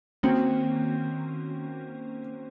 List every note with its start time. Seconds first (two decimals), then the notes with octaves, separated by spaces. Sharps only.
0.23 D#3 A#3 C4 C#4 F#4